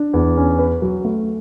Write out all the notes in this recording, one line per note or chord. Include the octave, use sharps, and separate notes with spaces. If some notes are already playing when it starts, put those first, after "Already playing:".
Already playing: D4
E2
C#4
B4
F#3
A3